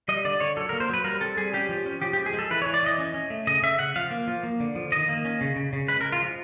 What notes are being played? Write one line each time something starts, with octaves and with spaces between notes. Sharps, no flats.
G3 D#5
D3 D5
D3 C#5
F#3 A4
A#4
A#3
C5
F#3 B4
G3 A#4
C4 A4
G3 G#4
C#4 G4
F3
C#4
F3 G4
G4
G#3
G#4
G#3
A4
E3 B4
C#5
E3
D5
E3 D#5
C#4
C#4
A3
C#3 D#5
C#3 E5
C#3 F#5
F3 F5
A#3
F3
A#3
D3
F3
D#3 D#5
A#3
C#4
C#3
C#3
C#3
G#3 B4
A#4
G#3
F4
F3